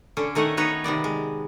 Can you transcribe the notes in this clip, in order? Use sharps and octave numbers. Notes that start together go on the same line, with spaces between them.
D3 C#4
D#3 A3 C#5 D#5 F#5
B3 D#4 B4 C#5
C3 D#3 B3 D5
G#3